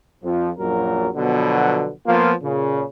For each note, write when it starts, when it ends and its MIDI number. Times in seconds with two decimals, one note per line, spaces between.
0.24 0.50 41
0.24 0.50 53
0.59 1.08 34
0.59 1.08 42
0.59 1.08 46
0.59 1.08 54
0.59 1.08 70
1.16 1.91 47
1.16 1.91 50
1.16 1.91 53
1.16 1.91 54
1.16 1.91 59
2.07 2.33 53
2.07 2.33 58
2.07 2.33 59
2.07 2.33 65
2.43 2.85 46
2.43 2.85 49